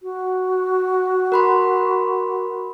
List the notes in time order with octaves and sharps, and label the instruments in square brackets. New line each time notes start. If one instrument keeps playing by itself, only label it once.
[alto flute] F#4
[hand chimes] A#4 B5 C6